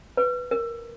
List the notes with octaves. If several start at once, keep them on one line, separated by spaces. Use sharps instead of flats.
B4
A#4